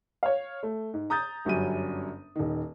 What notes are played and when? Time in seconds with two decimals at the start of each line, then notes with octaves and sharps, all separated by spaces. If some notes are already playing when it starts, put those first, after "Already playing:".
0.23 C#5 F5
0.63 A3
0.94 G#2
1.10 A#5 D#6 G6 A6
1.45 G1 F#2 F#3 G3 C#4 D#7
2.36 D#1 D#3